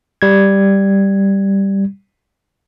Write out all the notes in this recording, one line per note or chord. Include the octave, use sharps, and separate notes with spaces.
G3 G#6